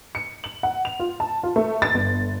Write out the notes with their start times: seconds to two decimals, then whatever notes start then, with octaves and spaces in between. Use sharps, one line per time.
0.15 C#7
0.44 F#7
0.63 F#5
0.85 F7
1.00 F4
1.20 A5
1.43 F4
1.56 A3
1.82 A6
1.94 G1